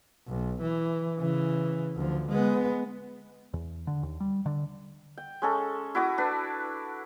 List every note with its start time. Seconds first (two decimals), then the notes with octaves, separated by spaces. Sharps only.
0.28 B1
0.62 E3
1.19 C#3 E3
1.96 D2 F3
2.29 G#3 B3
3.54 E2
3.87 D3
4.03 D#2
4.20 G3
4.46 D3
5.17 G5
5.42 G#3 C#4 A4
5.95 E4 F#4 D6 D#6
6.18 D4 B4